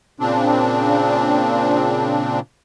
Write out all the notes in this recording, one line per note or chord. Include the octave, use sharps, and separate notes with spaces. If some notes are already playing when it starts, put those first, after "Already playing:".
A#2 C#3 C4 D4